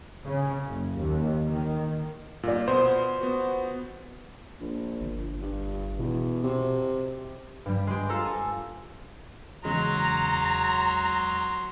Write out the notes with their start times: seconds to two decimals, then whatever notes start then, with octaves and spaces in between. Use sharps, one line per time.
0.24 C#3
0.66 F#1
0.95 D#2
1.45 D#3
2.43 A#2 F4 D5
2.68 B2 B3 C5
3.21 B3 F#4
4.61 A#1
5.01 G1
5.42 G2
5.99 E2 B2
6.43 C3
7.66 G2 G3
7.87 G#3 G4
8.09 F4 A4 A#5
8.25 G#5
9.65 E2 C#3 F#3 G#3 A#5 C6